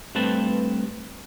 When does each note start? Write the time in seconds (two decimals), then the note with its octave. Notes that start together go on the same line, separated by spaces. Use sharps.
0.15 G2 A3 C4 B4 A5